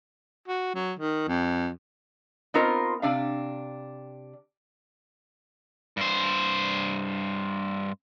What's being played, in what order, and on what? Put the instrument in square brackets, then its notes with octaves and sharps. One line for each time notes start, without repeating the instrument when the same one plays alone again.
[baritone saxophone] F#4
F#3
D#3
F2
[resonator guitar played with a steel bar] B3 C4 D#4 F4 A#4 C5
C3 D4 F5
[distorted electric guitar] G2 C5